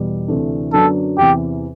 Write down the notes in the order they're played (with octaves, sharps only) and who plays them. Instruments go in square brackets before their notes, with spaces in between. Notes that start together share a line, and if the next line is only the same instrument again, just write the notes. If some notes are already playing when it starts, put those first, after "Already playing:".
Already playing: [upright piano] E2 B2 G3
D2 C3 E3 A3 D4
[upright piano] F#2 D3 F#3 B3 D4 [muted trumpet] A4
[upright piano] E2 C3 E3 [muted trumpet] G4